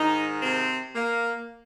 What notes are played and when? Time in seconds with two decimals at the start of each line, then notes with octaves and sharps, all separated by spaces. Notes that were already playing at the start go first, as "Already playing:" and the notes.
Already playing: G#2 D#3 D#4
0.42 C3 C4
0.95 A#3